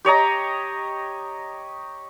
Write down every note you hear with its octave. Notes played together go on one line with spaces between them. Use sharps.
G4 C#5 D#5 A#5